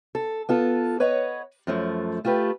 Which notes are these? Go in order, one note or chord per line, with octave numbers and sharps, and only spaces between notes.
A4
B3 F4 A4
B4 C#5 D#5 F#5
F#2 F3 A3
A3 F4 G4 B4